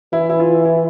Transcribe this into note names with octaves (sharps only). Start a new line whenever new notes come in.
E3 E4
E4
F4
E4